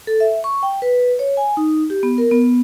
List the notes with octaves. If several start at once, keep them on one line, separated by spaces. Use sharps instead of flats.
A4
E5
C#6
G5
B4
C#5
G#5
D#4
G4
B3
A#4
B3